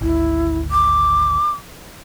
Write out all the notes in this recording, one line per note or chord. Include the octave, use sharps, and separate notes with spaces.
G#1 D2 E4
D6